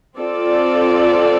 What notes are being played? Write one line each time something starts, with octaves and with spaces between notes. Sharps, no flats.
C4 F4 A4 D5